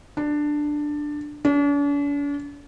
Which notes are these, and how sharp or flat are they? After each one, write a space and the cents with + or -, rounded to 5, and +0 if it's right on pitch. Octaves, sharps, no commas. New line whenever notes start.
D4 +10
D4 -45